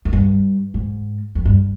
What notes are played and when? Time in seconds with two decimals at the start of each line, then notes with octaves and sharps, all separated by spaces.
0.05 F2
0.13 G2
0.74 G#2
1.35 F2
1.45 G2